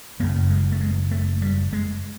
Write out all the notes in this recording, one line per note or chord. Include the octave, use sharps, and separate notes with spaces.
F#1 F#2 C#3 A#3
G#3
A3
G#3
A3
G3
G#3